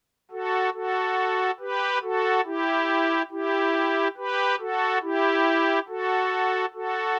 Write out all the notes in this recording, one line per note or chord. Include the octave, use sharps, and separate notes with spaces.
F#4 A4
F#4 A4
G4 B4
F#4 A4
E4 G4
E4 G4
G4 B4
F#4 A4
E4 G4
F#4 A4
F#4 A4